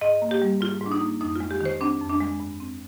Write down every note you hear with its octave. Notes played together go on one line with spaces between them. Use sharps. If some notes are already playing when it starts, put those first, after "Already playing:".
G#2 D#5
A#3
G4
G3
G#2 F4
G#2
D4
D#4
A#3
F2 D#4
G#3 F4
G4
D#3 C5
C4 D4
F2
D4
G#3
G2
C4